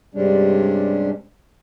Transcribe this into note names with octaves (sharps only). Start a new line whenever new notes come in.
G2 C3 G3 G#3 C#4 D4